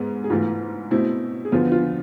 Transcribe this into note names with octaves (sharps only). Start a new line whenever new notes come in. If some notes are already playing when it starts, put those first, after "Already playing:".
Already playing: G#2 G#3 B3
G#4
G#2 E3 A3 F4
B2 A3 C4 E4
G#4
E2 D3 F3 B3 F4
F4